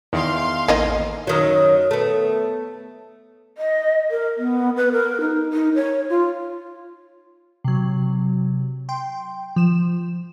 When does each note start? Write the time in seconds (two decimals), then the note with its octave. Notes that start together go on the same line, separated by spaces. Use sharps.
0.13 E2 D#3 F5 C6
0.68 A1 A#3 D#4 D#5
1.27 F#2 D#3 F#3
1.91 A3 B3
3.58 D#5
4.11 A#4
4.38 B3
4.76 B4
4.92 A#4
5.21 D#4
5.53 D#4
5.75 C#5
6.10 F4
7.64 C3 F#3
8.89 G5 C6
9.56 F3 E7